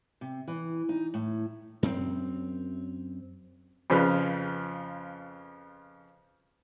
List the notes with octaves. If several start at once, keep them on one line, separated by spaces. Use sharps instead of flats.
C3
E3
D#4
A2
F#2 C4
F2 C#3 F3 B4 B5 F6